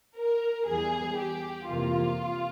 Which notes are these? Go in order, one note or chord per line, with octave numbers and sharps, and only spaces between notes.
A#4
E2 E3 G3 G#4
G4
F2 C3 E3 A#3 F4